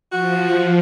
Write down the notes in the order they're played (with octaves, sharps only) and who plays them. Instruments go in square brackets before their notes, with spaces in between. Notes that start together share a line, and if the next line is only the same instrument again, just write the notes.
[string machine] F3 [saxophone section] F#4